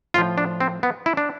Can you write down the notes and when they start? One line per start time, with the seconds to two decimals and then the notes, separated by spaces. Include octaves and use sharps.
0.14 A2 F3 F4
0.38 D4
0.61 C4
0.83 B3
1.06 E4
1.17 D4